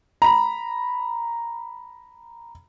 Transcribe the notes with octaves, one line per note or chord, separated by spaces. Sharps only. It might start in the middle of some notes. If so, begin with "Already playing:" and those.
A#5 B5